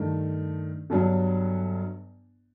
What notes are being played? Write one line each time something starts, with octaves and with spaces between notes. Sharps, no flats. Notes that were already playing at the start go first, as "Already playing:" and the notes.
Already playing: G2 D#3 A3
G1 G2 F#3